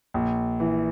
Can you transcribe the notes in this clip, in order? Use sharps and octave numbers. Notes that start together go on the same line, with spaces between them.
A#1
E3